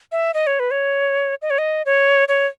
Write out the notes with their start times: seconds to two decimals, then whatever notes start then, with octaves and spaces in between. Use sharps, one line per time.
0.12 E5
0.34 D#5
0.47 C#5
0.60 B4
0.71 C#5
1.42 D#5
1.50 C#5
1.58 D#5
1.86 C#5
2.28 C#5